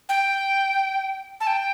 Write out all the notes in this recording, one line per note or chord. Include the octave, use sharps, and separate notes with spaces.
G5
A5
G5